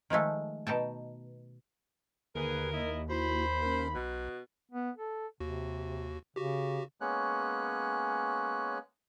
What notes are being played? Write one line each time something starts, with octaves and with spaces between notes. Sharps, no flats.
D#3 F3 G#3 A3
B2 D#4 G5 A5
D#2 D3 G#4 A#4 B4
E4 D#5
E4 F#4 C5 B5
C#4 A#4
B1 B2
B3
A4
D#2 C3 F#4
C#3 F#4 G4
G#3 A#3 B3 C#4 C#5 F#6